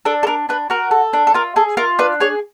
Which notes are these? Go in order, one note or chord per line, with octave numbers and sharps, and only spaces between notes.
D4 A4
A4
D4 A#4
D4 B4
F#4 A#4
A4
D4
A4
F4 A#4
G#4 A4
F4 A#4
D4 B4
G#4 C#5